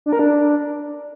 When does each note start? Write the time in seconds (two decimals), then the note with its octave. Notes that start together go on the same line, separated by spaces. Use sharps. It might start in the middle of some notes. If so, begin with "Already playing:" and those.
0.06 D4
0.13 A#4
0.19 D4